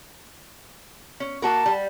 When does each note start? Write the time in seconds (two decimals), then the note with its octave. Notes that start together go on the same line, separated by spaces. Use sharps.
1.20 C#4
1.42 A#3 F#4 A#4 A5
1.66 G3